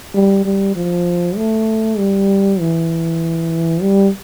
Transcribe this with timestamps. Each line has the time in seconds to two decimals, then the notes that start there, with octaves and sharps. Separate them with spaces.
0.14 G3
0.45 G3
0.76 F3
1.36 A3
1.98 G3
2.60 E3
3.82 G3